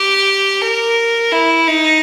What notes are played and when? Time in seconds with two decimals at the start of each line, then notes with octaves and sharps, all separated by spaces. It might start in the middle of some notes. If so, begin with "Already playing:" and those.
Already playing: G4
0.61 A#4
1.32 E4
1.67 D#4